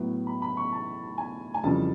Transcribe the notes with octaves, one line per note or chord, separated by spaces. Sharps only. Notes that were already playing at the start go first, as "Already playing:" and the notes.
Already playing: A2 F#3 B3
B5
B5
C#6
A5
G#5
G#5
F2 C#3 E3 G3 A5